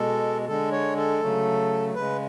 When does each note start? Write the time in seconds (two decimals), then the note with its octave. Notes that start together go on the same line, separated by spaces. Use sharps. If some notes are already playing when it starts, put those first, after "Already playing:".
Already playing: B2 G#3 A4
0.47 D3 G#3 A4
0.72 C#5
0.97 A4
1.21 C#3 F#3 A3
1.95 C#3 G#3 B4